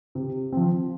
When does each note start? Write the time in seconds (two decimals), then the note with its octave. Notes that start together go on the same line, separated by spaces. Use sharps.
0.15 C3
0.53 F3 C4